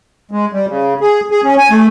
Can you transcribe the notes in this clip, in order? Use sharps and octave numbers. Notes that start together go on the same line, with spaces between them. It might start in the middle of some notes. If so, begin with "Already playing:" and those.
G#3
G3
C#3
G#4
G#4
C#4
G#5
A3